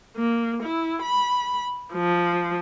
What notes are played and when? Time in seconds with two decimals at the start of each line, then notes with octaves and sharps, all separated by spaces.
0.17 A#3
0.63 E4
1.03 B5
1.94 F3